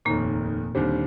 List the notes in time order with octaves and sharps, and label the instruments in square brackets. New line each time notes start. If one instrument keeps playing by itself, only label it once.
[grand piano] F1 D#2 D#3 [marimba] A#2 A#3
[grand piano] D#2 D3 G3 C4